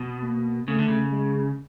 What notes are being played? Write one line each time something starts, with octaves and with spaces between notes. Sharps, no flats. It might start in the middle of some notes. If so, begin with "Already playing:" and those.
Already playing: B2
A#3
C#3 A3
D3
C#3
G#3